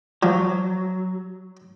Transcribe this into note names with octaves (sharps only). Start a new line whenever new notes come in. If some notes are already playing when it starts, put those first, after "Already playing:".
F3 F#3